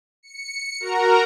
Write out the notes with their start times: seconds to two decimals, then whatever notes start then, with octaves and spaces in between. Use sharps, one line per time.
0.23 C#7
0.80 F#4 A#4 A#5